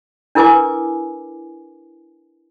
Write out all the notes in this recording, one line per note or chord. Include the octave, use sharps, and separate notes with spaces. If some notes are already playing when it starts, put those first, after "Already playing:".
D4 E4 A#4 B4 G#5 D6